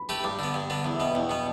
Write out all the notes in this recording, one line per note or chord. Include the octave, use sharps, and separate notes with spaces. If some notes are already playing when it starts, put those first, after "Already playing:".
Already playing: B5
A3 G4 B4
G2 D6
D3 B3
G2
D3 B3
E2 B5
E5
B2 B3 G5
E2 G5
B2 B3